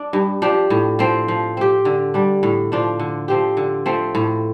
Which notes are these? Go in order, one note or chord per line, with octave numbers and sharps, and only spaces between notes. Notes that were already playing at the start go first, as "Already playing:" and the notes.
Already playing: D4
G2
F3 D4 G4
A2
F3 C4
F3
C4 G4
D3
G3 D4
A2
F3 D4 F4
D3
F3 C4 G4
D3
F3 A3 C4
A2